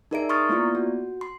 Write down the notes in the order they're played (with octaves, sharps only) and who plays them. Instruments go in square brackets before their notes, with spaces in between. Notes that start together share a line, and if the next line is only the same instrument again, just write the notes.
[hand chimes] D#4 G#4 A#4 D5 E5 D7
A#5 C6 C#6 D#6 F6 A6
A#3 B3 E4 F4 D5
F#4
C6